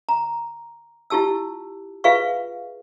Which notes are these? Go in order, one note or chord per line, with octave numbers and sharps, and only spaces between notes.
A#5
E4 F4 G4 A5 E6
F4 G#4 B4 E5 F5 C#6